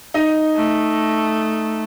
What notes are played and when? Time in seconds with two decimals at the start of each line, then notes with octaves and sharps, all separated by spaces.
0.14 D#4 D#5
0.56 A3